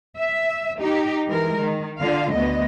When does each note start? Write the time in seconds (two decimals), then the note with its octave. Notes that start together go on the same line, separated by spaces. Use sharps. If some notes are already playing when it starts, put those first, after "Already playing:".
0.18 E5
0.80 D#4 G4
1.28 E3 G#3 A#4
1.60 D#3
1.98 D3 F4 F5
2.32 D2 B3 D#5